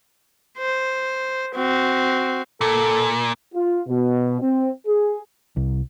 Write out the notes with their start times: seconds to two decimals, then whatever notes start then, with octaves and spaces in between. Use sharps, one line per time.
0.58 C5
1.55 C4 F#4
2.61 A#2 A4
3.54 F4
3.88 B2
4.41 C4
4.87 G#4
5.56 C2